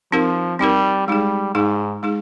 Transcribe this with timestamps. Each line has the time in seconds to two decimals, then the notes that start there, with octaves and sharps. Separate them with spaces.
0.12 F3 C4 D#4 G4 A#4
0.59 G3 C4 D#4 G4 A#4
1.08 G3 G#3 D#4 G#4
1.55 G#2 G#3 D#4 G#4
2.03 G#3 D#4 G#4